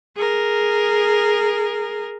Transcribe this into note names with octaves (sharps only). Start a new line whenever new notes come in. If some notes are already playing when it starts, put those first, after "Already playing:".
G#4 A#4